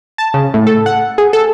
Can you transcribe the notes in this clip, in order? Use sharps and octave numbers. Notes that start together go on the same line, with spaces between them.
A5
C#3
A2
A4
F#5
G#4
A4